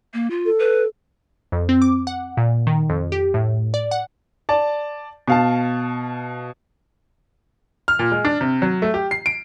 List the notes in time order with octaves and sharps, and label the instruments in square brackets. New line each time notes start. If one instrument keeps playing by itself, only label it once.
[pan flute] A#3
F4
[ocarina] A4
[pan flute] B4
[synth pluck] F2
C4
D6
F#5
A#2
D#3
F2
G4
A2
D5
F#5
[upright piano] D5 A5
B2 F5 A5
F6
A#2
G#3
D4
C3
F#3
A3
G4
C7
D7